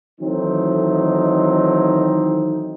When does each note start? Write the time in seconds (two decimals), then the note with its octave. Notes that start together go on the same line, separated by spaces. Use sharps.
0.21 D#3 E3 F#3 A3 C4 D#4